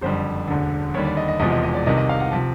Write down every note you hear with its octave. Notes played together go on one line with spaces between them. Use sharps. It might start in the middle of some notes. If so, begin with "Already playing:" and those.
F#1 F2 D3 G3 C5
E1 D2 D3
D#2 D3 G3 C#5
D5
D#5
D#5
E1 E2 C3 F3 G#3 D#5
D#5
D#5
D5
C2 C3 D#3 D#5
D#5
F5
F#5
C3 F3 A5